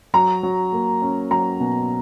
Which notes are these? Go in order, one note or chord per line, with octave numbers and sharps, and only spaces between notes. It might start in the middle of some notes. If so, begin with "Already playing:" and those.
F#3 A#5
F#3
A#3
C#4
F#3 A#5
B2